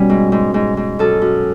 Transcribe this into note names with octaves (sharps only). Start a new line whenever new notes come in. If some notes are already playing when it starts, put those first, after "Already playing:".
Already playing: B2 G3 C#4
G#2
G#2
G#2
G#2
F#2 A4
F#2